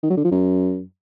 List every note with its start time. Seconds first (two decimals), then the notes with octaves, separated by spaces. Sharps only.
0.03 D#3
0.10 F#3
0.17 D3
0.24 F3
0.31 F#2